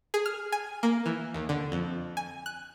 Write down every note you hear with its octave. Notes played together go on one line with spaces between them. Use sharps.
G#4
F6
G#5
A#3
E3
D#2
D3
F2
G#5
F#6